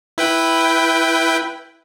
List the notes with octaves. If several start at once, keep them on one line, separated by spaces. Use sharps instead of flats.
E4 B4 G5